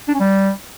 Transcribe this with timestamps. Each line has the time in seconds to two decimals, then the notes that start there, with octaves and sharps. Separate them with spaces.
0.08 D4
0.14 C#4
0.20 G3